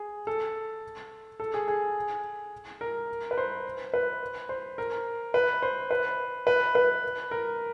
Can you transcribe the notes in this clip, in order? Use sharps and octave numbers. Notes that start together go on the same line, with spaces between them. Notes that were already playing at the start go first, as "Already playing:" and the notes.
Already playing: G#4
A4
A4
G#4
G#4
A#4
B4
C5
B4
C5
A#4
B4
C5
B4
B4
B4
A#4